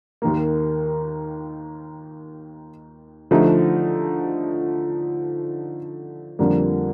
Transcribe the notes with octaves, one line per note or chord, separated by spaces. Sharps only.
D#2 D#3 A#3
D3 F3 A3 D#4
F2 D3 G3 A#3